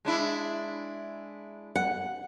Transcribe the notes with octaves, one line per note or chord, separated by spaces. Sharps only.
G#3 D4 E4
F#5